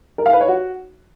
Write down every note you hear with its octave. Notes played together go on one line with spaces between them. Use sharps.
A#4
F5
B4
C#5
F#4